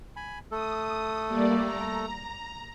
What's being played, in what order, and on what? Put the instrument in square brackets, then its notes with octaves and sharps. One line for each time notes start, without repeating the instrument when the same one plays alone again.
[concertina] G#5 B5
[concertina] A3 A4 [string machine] D#6
[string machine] G3 A#3 D5
A#5